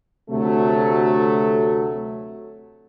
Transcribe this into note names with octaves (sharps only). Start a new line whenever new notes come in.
D2 C3 F#3 A3